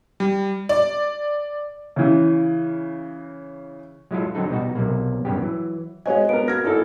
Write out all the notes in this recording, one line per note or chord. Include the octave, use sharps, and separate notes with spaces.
G3
D5
C#3 E3
F#3 G#3 E4 F4 A4
D3 F#3 C4 D4 D#4 A4
B2 G3 D#4 F#4
B1 C3 A#3
G2 C#3 A#3 B3 C#4 G4
E3 F#3
G#3 F#4 G#4 C#5 D#5 F5 G#5
B3 D4 A#4 D7
A#3 F#4 F6 G#6 A#6
G#1 E4 A4